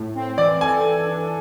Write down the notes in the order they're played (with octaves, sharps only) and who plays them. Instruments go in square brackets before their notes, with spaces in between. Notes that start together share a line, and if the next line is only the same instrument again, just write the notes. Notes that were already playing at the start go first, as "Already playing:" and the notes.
Already playing: [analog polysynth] A2
C4
[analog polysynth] E3 [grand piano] D5
[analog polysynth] A4 [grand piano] G#5
[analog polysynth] E3
D4